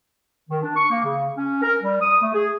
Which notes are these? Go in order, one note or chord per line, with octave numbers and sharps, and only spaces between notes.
D#3
D4
C#6
A#3
C#3
C#4
A#4
G3
D#6
A3
G#4